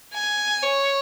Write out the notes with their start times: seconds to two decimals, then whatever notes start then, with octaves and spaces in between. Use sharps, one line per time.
0.14 G#5
0.63 C#5